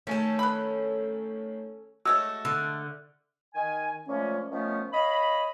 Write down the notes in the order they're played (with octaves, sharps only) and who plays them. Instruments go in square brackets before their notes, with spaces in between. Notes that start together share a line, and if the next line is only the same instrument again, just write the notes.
[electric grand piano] D#3 A3 G#5 [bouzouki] C#4 A4
[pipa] B4 B5
[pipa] G#3 A3 C#5 [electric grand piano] F#4 [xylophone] E6
[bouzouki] D3 [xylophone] E6 [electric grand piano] F6
[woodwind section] D#3 G#5
A#2 F3 G#3 A3 C#4
D#3 F3 A3 B3 C#4
C#5 D#5 F5 B5